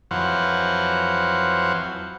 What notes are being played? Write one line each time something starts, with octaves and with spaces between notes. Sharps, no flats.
F2 E3 F#3 C5 F5 F#5